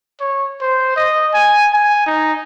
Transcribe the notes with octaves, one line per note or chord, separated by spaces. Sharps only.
C#5
C5
D#5
G#5
G#5
D#4